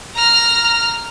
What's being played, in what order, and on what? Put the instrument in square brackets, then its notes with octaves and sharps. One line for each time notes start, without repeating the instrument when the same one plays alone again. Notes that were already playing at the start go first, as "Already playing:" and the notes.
[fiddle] A#5 F6